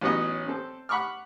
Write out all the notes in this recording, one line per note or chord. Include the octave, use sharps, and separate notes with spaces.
A1 F#3 B3 D#4 C#5 D#5
C4 A4
F#5 B5 C#6 D6 F6